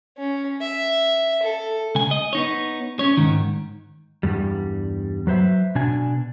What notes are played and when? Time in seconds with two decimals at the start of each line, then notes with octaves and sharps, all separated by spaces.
0.18 C#4
0.61 E5
1.43 A4
1.95 C#2 G#5
2.11 D#5
2.33 B3 D#4 C#5
2.99 C#4 C#5
3.17 G#2 D#3
4.23 E2 G2 G3
5.27 F#3 B4 C5 E5
5.75 B2 D4 G#5